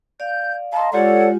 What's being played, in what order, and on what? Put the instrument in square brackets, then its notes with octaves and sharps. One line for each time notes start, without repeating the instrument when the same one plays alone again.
[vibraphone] D5 F5 [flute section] G6
[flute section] D#5 [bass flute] F5 [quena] A5 [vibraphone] A#5 C6
[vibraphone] G#3 F4 G4 [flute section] A4 C#5 [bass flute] D5 [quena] F#5